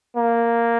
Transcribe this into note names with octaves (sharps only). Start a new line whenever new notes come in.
A#3